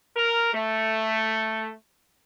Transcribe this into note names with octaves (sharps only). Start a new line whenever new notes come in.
A#4
A3